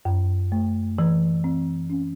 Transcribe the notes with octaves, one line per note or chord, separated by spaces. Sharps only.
F#2
A3
E3
C4
C#4